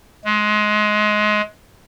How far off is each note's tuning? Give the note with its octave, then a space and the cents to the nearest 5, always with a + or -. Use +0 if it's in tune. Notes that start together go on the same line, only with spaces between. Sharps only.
G#3 +25